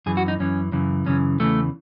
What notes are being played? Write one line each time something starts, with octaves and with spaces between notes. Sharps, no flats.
F#2 E3 G#4
F#4
D#4
F#2 E3 C#4
F#2 C#3 E3
F#2 C#3 E3 C#4
E2 C#3 E3 A3